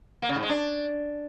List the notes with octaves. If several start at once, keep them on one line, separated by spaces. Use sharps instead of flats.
A#3
C#3
G#2
G#3
D4